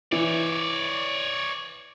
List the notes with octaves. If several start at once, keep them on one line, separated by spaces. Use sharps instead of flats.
E3 C#5 D5